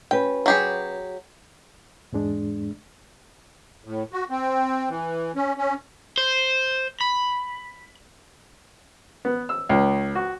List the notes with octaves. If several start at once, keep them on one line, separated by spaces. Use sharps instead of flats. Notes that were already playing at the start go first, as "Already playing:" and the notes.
C#4 F#4 B4 G5
F#3 G4 G#4
E2 G#2 G#3 D4
A2
F#4
C4
E3
C#4
C#4
C5
B5
B3
E6
C#2
F#4